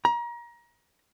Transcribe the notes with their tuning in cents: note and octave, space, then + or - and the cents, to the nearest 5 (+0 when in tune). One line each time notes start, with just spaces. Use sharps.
A#5 +30